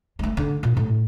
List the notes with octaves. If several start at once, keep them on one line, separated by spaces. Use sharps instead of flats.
G3 A3
D3
A#2
A2